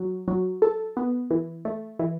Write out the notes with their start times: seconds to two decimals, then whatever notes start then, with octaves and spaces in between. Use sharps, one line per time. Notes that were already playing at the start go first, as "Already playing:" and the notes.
Already playing: F#3
0.28 F#3
0.62 A4
0.97 B3
1.31 E3
1.65 A3
1.99 E3